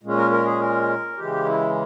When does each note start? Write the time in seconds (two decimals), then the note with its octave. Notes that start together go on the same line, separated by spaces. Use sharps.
0.03 A#2 G#3 C#4
0.17 A#4
0.31 A#4
0.45 G#4
0.60 A#4
1.17 C#3 E3 G#3 G4
1.46 E4